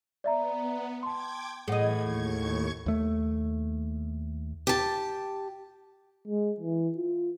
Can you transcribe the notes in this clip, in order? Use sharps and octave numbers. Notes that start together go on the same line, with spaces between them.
B3 D5 E5 A#5
G5 A5 C6 D6 G#6
A2 E3 G#4 D#5 F#5 G#6
D#2 C#6 G#6
D#2 A3
G4 A5
G#3
E3
F4